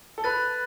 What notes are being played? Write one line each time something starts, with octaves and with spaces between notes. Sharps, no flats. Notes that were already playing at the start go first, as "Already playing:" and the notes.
A4
B4 B5 F#6 A6